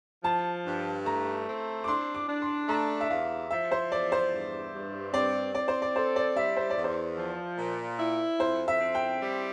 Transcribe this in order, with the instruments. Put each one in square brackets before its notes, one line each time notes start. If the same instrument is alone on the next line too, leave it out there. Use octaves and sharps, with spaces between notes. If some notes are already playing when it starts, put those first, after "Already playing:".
[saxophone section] F3 [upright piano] A5
[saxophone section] G2
[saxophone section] A3 [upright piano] A#5
[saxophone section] C4
[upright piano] D6
[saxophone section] D4 [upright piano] C6
[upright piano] D6
[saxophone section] D4
[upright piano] C6
[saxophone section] A3 [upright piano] A#5
[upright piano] E5
[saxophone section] E2 [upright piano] F5
[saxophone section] F3 [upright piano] E5
[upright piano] C5
[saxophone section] E2 [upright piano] D5
[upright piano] C5
[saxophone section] G2
G2
[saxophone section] C4 [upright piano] D5
[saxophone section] C4 [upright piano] D5
[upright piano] C5
D5
[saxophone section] A4 [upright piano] C5
[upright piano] D5
[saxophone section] G3 [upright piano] E5
[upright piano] C5
D5
[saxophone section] E2
[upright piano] C5
[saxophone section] F3
A#2
E4
[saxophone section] F2 [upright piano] C5
[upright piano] E5
[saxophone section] C4
[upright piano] G5
[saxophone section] G3